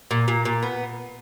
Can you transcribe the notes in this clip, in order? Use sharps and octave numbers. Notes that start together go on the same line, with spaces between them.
A#2
A#2
A#2
B3